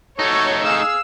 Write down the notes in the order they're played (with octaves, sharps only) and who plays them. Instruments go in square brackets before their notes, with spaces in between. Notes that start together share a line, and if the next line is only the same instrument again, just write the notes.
[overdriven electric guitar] A3 D#4 [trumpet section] F#4 A4 [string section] C#5
[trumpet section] G#4 F5 [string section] E6